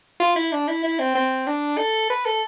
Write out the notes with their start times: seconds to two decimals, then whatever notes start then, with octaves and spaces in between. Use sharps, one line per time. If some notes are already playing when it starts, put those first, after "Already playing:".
0.20 F4
0.36 E4
0.52 D4
0.68 E4
0.84 E4
0.99 C4
1.15 C4
1.47 D4
1.78 A4
2.10 B4
2.26 A4